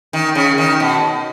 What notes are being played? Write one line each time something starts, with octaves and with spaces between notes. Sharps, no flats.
D#3
C#3
D#3
B2